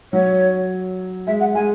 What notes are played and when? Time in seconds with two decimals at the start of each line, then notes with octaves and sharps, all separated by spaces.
0.13 F#3 C#5
1.27 G#3 E5
1.40 F#5
1.54 G#3 G#5